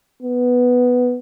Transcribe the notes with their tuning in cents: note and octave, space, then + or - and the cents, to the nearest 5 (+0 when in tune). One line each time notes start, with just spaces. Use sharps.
B3 +0